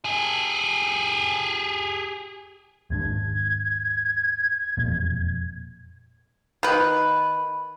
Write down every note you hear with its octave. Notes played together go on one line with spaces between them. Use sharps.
G4 G#4
D#2 G#2 D4 G#6
E1 F2 A#2
D#3 B4